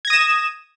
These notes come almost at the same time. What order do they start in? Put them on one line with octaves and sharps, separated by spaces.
G#6 A#6 D#6 E7